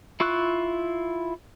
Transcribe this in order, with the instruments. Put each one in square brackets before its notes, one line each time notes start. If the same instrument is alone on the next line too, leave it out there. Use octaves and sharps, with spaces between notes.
[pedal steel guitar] E4 F4 C#6 E6 F#6